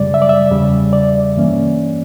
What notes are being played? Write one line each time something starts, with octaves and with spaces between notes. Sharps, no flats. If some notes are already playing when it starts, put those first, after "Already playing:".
Already playing: F#2 C#3 G3 D5
E5
D5
E5
E2 C#3 G3
D5
G2 E3 A#3 C#4